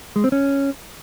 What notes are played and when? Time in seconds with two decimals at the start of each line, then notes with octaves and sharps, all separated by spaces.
0.16 G#3
0.24 C4
0.32 C#4